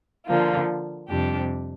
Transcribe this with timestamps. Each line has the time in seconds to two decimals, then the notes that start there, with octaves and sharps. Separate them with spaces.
0.27 D3 F3 A#3 F4
1.09 F2 C3 G3 D4 G4